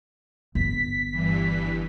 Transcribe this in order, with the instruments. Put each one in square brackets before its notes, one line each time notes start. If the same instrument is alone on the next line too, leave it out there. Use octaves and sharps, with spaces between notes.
[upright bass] G1 [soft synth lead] B6
[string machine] G2 E3